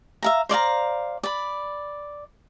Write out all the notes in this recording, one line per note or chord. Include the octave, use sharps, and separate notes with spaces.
E5 F5 A#5
C5 D5 F5 A#5
D5 B5